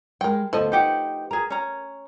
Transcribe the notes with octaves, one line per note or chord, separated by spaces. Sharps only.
G3 G#3 A#4 G5
D2 F3 B3 A4 D#5 A5
D#4 G4 B4 F#5
G#4 A#4 A#5
C#4 A#5